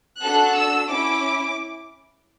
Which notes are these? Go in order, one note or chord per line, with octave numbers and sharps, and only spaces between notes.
D4 F#4 A4 F#6
E6
C#4 E4 D6